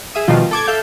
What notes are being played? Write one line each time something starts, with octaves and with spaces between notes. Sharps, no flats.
G#4 E5 D#6
B2 D#3 F3 G3 F4
A4 D6 G#6
A4 E5 F5 G6